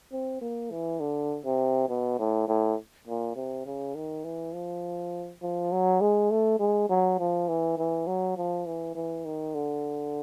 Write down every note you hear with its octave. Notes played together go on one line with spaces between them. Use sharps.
C4
A#3
E3
D3
C3
B2
A2
A2
A#2
C3
C#3
D#3
E3
F3
F3
F#3
G#3
A3
G#3
F#3
F3
E3
E3
F#3
F3
E3
E3
D#3
D3